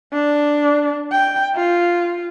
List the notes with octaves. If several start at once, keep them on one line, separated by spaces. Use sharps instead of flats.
D4
G5
F4